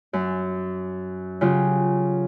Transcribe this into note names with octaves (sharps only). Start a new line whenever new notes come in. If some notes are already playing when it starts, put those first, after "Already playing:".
F#2
C#3 F#3 F4 G4